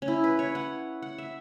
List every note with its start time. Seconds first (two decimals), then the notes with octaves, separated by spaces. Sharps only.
0.02 C#4
0.08 E4
0.24 B4
0.39 C#5
0.55 F#5
1.02 F#5
1.18 E5